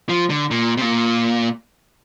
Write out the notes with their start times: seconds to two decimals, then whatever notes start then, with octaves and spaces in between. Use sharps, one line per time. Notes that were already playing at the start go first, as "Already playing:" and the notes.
0.09 F3
0.30 D3
0.51 A#2
0.77 C3
0.82 A#2